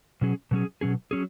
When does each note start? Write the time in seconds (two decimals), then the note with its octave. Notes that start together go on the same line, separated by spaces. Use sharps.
0.21 B2 F#3 C#4 G#4
0.51 B2 F#3 C#4 G#4
0.81 B2 F#3 C#4 G#4
1.11 F#3 C#4 G#4